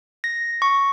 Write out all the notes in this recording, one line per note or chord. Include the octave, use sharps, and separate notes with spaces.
A#6
C#6